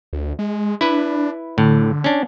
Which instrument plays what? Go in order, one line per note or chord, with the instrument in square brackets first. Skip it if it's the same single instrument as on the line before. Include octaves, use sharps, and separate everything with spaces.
[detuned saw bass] D2
G#3
[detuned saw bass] D4 [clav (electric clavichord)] E4 B4
[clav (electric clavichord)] A2 [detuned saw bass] D3
[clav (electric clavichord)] C#4 D4